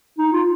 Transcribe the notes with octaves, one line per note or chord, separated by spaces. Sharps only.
D#4
F4